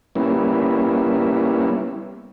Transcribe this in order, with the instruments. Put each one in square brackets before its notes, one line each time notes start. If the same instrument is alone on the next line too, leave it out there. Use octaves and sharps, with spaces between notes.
[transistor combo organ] G3 A#3 B3 C#4 E4